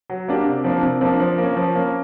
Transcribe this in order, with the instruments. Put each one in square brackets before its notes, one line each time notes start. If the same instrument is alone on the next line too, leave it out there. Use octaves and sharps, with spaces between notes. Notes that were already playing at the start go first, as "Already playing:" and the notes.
[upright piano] F#3
A#3 D4 G4
C3
F3 A#3 D4
C3
F3 A#3 D4
F3
A#3 C#4
F3
A#3 C#4